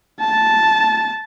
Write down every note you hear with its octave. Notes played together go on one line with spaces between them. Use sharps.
A5